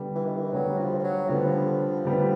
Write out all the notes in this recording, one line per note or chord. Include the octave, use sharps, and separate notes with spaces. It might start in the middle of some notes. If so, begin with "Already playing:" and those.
Already playing: D3 G3 B3
E3
D#3
E3
D3 F#3 G3 B3
F3
F3
F#3
D3 F3 G3 B3
D3 G3 B3